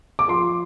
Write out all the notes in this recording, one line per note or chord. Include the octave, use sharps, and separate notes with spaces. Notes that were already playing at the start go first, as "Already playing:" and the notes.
D6
F3 C6